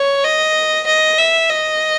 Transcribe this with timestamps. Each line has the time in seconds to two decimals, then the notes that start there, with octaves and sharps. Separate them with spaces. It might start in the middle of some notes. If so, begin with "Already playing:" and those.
Already playing: C#5
0.24 D#5
0.87 D#5
1.19 E5
1.50 D#5